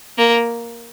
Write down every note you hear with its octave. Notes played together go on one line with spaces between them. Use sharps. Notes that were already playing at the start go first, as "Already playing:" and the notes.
A#3